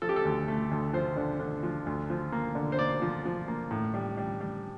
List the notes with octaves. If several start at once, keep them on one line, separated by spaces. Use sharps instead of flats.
F3 A4
G4
A4
D2
A3
D2
F3 C5
D3
D3
F3
D2
F3
A#3
D3
C5
A#3 D5
F3
F3
A#3
A2
G3
G3
G3